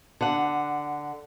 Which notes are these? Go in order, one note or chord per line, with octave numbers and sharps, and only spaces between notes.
D3 F#5